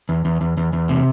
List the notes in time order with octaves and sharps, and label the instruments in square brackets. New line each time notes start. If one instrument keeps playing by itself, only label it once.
[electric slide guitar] E2
E2
E2
E2
E2
C3